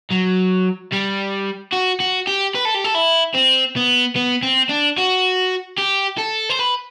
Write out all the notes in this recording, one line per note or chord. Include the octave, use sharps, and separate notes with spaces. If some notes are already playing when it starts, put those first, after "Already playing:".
F#3
G3
F#4
F#4
G4
B4
A4
G4
A4
E4
C4
B3
B3
C4
D4
F#4
G4
A4
C5
B4